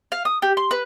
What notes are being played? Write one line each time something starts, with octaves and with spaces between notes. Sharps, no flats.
F5
D#6
G4
C6
B4